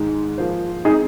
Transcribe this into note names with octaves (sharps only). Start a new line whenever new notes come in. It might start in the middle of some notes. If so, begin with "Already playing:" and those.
Already playing: G#2 D#3 G#3 D#4
F3 A#3 F4 G#4 C5
G#3 C4 D#4 G#4